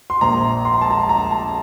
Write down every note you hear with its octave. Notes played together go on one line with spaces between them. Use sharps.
C6
A#1 A#2 F3 A#5
C6
A#5
A5
A#5
A#5
A5